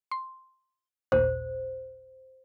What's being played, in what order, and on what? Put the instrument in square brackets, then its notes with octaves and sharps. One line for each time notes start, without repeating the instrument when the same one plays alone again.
[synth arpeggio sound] C6
[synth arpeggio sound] A1 D#2 A#2 [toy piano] C5